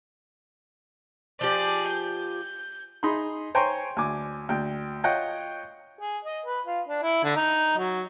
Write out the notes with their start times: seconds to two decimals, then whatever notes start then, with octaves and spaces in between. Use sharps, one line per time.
1.41 F3 G4 G#4 D5
1.90 G6
3.03 D#4 G#4 B5 C6
3.55 C5 C#5 G5 G#5 A#5 C6
3.97 D2 G#5 D6
4.49 D2 G5
5.04 F4 C#5 D#5 F#5 G5
6.01 G#4
6.25 D#5
6.46 B4
6.66 F4
6.88 D4
7.03 E4
7.24 D3
7.36 D#4
7.77 F#3